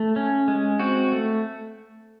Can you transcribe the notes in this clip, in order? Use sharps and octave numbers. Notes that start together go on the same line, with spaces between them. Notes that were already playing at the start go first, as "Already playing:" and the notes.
Already playing: A3
C#4
G#3
C4 F#4
A3